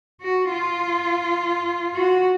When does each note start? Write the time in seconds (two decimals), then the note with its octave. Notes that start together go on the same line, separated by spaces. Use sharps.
0.21 F#4
0.51 F4
1.95 F#4